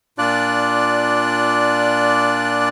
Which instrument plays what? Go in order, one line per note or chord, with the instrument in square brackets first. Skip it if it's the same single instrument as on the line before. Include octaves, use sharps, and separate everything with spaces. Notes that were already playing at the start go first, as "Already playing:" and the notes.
[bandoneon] A#2 D4 F4 D5 F#6